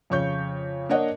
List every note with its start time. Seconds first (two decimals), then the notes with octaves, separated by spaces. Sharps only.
0.10 F2 C#3 C#5 C#6 G6
0.89 A#3 D4 A#4 C#5 D#5 F#5